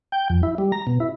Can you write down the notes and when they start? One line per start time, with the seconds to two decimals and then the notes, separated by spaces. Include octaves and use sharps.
0.12 G5
0.30 F2
0.43 E4
0.58 G3
0.72 A#5
0.87 B2
1.00 E4